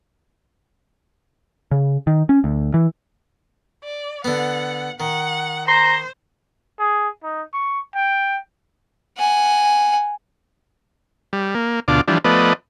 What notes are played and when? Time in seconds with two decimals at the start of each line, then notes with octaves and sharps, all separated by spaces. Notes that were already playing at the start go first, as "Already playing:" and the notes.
1.71 C#3
2.07 D#3
2.29 C#4
2.44 D2
2.74 E3
3.84 D5
4.25 D3 B3 F#5
5.00 D#3 F#5
5.68 C5 A#5 C6
6.79 G#4
7.23 D#4
7.53 C#6
7.95 G5
9.18 F#5 G#5
11.33 G3
11.55 A#3
11.88 D2 B2 D4 F4 D6
12.08 E3 F3 G3 D4
12.24 F3 A3 B3 B4 D5 D#5